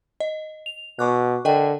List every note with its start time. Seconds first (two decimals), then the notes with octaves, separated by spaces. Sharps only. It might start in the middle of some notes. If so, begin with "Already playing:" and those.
0.20 D#5
0.66 F7
0.99 B2 C#6 D6 F#6
1.45 D3 A#4 D#5 G5